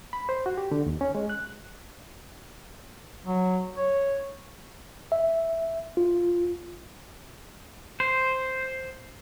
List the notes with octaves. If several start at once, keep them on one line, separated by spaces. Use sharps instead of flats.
B5
C5
F#4
G4
D3
D#2
C#4
G#3
F#6
F#3
C#5
E5
F4
C5